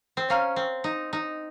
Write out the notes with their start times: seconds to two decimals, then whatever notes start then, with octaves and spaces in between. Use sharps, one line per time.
0.17 C4
0.29 C#4 C5 F5 A#5 F6
0.56 C4
0.84 D#4
1.13 D#4